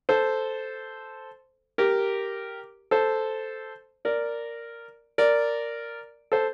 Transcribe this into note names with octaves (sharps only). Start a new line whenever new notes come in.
A4 C5
G4 A#4
A4 C5
A#4 D5
A#4 D5
A4 C5